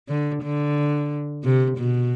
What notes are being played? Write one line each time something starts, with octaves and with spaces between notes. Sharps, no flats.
D3
D3
C3
B2